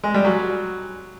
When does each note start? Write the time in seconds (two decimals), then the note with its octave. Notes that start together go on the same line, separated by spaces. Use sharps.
0.04 G#3
0.14 G3
0.25 F#3